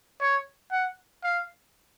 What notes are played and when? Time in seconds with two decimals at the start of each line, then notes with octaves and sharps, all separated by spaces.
0.21 C#5
0.71 F#5
1.23 F5